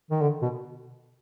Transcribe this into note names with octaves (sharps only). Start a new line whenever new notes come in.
D#3
D3
B2